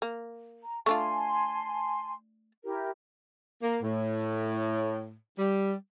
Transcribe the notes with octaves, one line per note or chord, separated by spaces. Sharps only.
A#3
A#5
A3 D4 F4 G#5 A5 C6
E4 G4 A#4
A#3
A2
G3